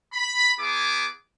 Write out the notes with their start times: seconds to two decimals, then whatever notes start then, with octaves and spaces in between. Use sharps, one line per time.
0.13 B5
0.60 B3 E4 G#4 A#5 D6